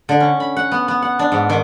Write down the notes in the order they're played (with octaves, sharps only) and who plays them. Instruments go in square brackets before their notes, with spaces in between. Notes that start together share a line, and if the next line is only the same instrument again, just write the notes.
[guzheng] D3
C#4
B5
F#5
B3
B3
F#5
D4
G#2
D#3